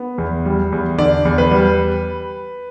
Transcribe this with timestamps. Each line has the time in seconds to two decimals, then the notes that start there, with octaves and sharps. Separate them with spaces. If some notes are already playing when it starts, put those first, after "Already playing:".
Already playing: B3
0.18 E2
0.45 G3
0.72 E2
0.98 D3 D5
1.25 E2
1.38 B4
1.51 G3